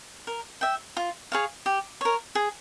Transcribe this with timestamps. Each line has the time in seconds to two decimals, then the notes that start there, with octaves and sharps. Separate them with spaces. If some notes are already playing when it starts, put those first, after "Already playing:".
0.27 A#4
0.61 E5 G5
0.97 F4
1.32 G#4 C#5 F5
1.66 G4
2.01 A#4 C#5
2.35 G#4